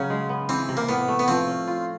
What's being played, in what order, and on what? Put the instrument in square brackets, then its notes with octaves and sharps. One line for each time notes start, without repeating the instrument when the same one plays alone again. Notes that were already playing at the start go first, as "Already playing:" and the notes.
Already playing: [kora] C#3 F#3 [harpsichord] C#4
[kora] G#3
B3
[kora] E3 [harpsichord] C4
[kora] C3
[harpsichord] A#3
[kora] A2 [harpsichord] B3
[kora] A3
[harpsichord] B3
[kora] F3 [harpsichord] C4
[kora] C#4
F4